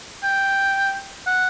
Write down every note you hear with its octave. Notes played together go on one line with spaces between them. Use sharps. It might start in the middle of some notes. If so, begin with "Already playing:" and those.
G5
F#5